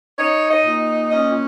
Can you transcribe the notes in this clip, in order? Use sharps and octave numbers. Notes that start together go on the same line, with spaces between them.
D#4 C#5
D#5
A#2
C#4 D#5